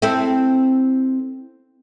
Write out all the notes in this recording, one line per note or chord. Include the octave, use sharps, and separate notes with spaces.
C4 E4 A4